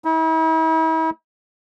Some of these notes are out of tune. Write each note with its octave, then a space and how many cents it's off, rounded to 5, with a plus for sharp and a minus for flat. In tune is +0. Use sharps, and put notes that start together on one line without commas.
E4 -45